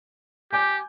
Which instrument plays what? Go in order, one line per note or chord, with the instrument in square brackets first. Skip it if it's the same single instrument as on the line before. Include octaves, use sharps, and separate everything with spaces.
[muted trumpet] G4 [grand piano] G#5 D6 G6